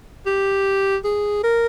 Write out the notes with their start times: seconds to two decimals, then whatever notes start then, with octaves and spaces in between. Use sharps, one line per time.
0.26 G4
1.04 G#4
1.43 A#4